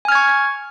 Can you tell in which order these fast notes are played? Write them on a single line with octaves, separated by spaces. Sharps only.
G#5 F6 G#6 C#6